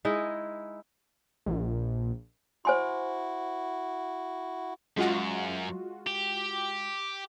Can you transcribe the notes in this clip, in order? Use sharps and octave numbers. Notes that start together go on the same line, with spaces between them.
G#3 D#4 E4 D#5
A#1
E4 F#4 C5 G#5 C6
F#2 G#3 F4 F#4
G4